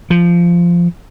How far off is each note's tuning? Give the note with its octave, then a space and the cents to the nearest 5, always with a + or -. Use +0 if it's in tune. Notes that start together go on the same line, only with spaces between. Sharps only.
F3 -10